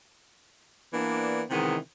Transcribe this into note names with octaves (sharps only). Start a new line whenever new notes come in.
E3 A#3 B3 D4
C3 D#3 E3 G#3 B3